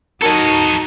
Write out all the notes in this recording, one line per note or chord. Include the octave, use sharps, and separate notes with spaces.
D#4 F#4 A4 A#4 C#5 D#5 A5